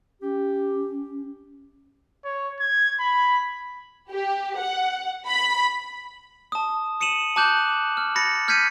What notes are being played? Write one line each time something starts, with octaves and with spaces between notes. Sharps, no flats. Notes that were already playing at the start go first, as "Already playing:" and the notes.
C#4 G4
C#5
G#6
B5
G4
F#5
B5
A5 D#6
D#6 C#7 D#7 E7 F#7
A5 D6 F#6 G6 F#7
F6
B5 A6 A#6 C#7
F6 G6 G#6 B6 C#7 D#7